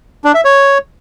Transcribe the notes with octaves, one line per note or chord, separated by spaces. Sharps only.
D4
E5
C#5